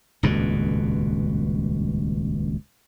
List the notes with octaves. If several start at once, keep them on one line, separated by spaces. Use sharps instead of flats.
D#1 C#2 G2 B2